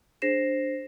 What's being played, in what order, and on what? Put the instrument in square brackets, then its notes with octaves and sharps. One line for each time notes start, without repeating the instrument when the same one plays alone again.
[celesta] D4 G#4 C5 A#6 C7 E7